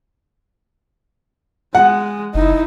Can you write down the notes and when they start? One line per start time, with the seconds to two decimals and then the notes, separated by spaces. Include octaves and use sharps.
1.75 G#3 F#5
2.34 F#1 D#4 E4 D#5